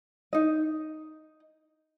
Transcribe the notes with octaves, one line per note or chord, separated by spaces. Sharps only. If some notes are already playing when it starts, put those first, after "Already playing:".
D#4 D#5